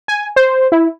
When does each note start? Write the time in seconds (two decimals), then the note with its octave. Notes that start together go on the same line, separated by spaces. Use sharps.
0.08 G#5
0.36 C5
0.72 E4